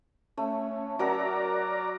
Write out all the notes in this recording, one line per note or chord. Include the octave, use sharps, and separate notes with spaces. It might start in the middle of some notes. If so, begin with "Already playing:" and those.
A3 C#4
F#3 F#4 A#4 D5 A#5